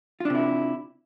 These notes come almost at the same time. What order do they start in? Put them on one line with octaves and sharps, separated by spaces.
F4 D4 C3 E4